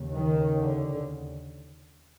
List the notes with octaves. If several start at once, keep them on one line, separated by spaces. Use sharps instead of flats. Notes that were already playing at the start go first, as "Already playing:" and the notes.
Already playing: D#2 C#3
D#3
D3